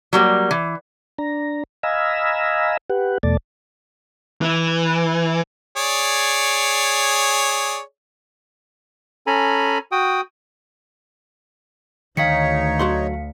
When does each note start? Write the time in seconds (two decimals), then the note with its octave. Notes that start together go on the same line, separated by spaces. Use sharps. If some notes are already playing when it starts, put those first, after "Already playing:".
0.13 F#3 G3 A#3
0.51 E3
1.19 D4 A#5
1.83 D#5 F5 G#5 A#5 B5 E6
2.90 G4 B4 F#5
3.23 E2 B2 A3 D5 A5
4.42 E3
5.76 G#4 C#5 D5
9.27 C#4 A4 G#5 A#5 B5
9.92 F#4 G5 D#6
12.17 D2 D#3 D#4 C#5 F5 B6 C#7
12.79 F#3 F#4 C6